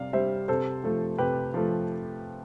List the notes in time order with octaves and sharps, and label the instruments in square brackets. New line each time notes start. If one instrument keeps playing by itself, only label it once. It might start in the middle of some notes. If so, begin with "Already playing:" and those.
Already playing: [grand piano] C3 G3 D5 F5
G3 C5 E5
C3 A4 C5
F3 A3
C3 G4 B4
F3 A3